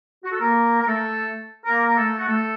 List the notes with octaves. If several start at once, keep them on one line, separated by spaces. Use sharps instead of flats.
F#4
A4
A#3 A#4
A#4
A3 A4
A#3 A#4
A#4
A3 A4
F#4
A3 A4